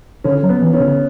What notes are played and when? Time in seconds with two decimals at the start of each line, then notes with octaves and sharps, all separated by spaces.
0.24 D3 C#4
0.43 F#3
0.49 B3
0.62 E3
0.74 C#4
0.80 D3